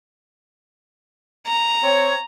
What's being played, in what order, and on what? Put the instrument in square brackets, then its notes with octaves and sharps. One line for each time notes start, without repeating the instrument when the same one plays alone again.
[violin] A#5
[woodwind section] C4 C#5